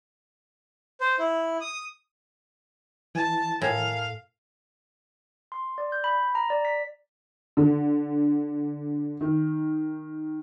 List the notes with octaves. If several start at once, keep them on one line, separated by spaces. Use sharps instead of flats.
C5
E4
D#6
E3 A5
A2 A4 A#4 F5 G#5
C6
D5
G6
B5
A#5
D5
B6
D3
D#3